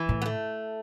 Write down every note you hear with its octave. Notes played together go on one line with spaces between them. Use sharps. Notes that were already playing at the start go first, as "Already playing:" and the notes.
Already playing: E3
A2
B3
A3